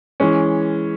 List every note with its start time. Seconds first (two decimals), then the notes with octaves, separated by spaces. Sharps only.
0.20 E3 G#3 C#4